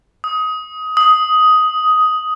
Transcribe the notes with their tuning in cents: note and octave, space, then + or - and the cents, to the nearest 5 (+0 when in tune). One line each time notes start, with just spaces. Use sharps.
D#6 +20
D#6 +10